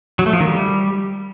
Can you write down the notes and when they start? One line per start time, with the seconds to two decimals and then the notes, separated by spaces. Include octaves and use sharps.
0.19 F#3
0.26 A3
0.33 F3
0.40 D#3
0.47 G3